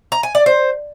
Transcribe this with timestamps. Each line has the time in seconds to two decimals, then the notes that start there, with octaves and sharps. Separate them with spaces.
0.12 A#5
0.23 G#5
0.35 D5
0.46 C5